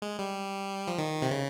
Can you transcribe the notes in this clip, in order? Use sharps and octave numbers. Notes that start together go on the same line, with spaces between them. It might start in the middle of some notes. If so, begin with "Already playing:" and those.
G#3
G3
F3
D#3
C3
C#3